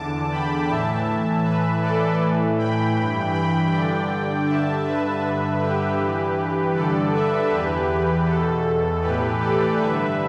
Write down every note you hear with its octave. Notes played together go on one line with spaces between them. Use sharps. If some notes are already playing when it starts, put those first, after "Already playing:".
Already playing: E2 D3 A5 D6
G5 B5
A2 E3 E5 A5
A2 E3 B4 E5
A4 D5
A2 E3
G5 B5
G2 E3
G5 B5
G2 D3 D5 G5
G2 D3 E5 A5
B4 E5
G2 D3
G4 B4
G2 E3
G2 D3 A4 D5
B4 E5
E2 E3 G4 B4
E2 B2 A4
A2 E3 G4 B4
A4 D5
G2 D3 B4 E5